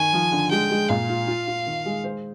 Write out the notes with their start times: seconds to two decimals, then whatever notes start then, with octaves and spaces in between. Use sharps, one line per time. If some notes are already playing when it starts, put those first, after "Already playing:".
Already playing: D#3 G#5
0.13 F3
0.32 D3
0.51 G#3 G5
0.71 G#3
0.90 A#2 F5
1.09 F4
1.27 F4
1.47 F4
1.66 D#3
1.86 G#3
2.04 C5